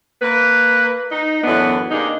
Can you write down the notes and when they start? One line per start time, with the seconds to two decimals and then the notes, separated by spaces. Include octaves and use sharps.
0.22 A#3 B4
1.12 D#4
1.44 F#2 A2 E3 B3 D4
1.91 C3 A#3 D4 D#4 G#4